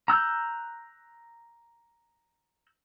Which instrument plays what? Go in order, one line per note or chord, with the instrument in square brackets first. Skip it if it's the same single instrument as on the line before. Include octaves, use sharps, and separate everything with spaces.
[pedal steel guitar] A#5 E6 F#6 G6